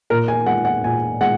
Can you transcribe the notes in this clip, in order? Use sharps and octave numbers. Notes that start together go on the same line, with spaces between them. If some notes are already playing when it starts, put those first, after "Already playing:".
A#2 A#4
G#5
G#3 F#5
F#5
A#2 G#5
G#3 F#5